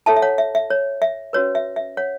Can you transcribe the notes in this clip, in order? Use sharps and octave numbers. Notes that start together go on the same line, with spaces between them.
E4 A4 C#5 E5 A5
E5
C#5 F#5
E5
E5
C#5
E5
C#4 F#4 B4 C#5
E5
E5
C#5 F#5